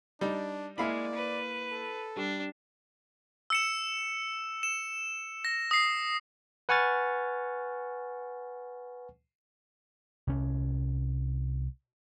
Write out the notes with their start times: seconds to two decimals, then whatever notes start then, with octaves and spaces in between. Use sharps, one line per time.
0.21 G3 D4 D#4
0.78 G#3 A#3 E4 D5 E5 F5 B5
1.15 B4
1.72 A4
2.16 G3 D4
3.50 E6 C#7 E7
4.63 E7
5.45 A#6
5.71 D#6 C7
6.69 B4 F#5 G#5 C#6 F6 A6
10.27 C2 C#4